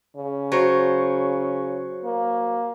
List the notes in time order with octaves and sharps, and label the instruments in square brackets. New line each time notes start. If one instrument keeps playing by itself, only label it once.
[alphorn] C#3
[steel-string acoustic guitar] F#3 C5 C#5
[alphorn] A#3